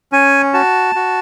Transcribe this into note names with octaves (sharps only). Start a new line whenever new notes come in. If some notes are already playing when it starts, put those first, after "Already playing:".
C#4 G#5
F#4 A5
F#4